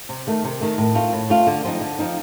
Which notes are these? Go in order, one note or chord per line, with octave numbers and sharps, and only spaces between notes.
C3
D#3 A3
C3
D#3 A3
A2
A3 C4 F4
A2
A3 C4 F4
D3
F3 C4 D#4
D3
F3 C4 D#4